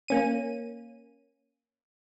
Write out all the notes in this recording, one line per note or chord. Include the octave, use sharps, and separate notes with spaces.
A#3 C#4 D#7